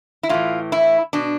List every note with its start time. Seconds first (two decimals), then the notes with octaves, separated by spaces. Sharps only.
0.23 E4
0.29 A2 E3 F4
0.72 E4
1.13 B2 D4